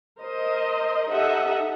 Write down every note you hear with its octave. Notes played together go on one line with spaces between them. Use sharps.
A#4 C5 D#5
D#4 G4 A4 D#5 E5 F#5